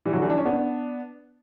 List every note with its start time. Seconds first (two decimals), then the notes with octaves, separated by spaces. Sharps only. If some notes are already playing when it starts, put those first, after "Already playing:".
0.05 E3 G3
0.13 D3 F#3
0.22 E3 G3
0.30 D4
0.38 C#4
0.45 B3 D4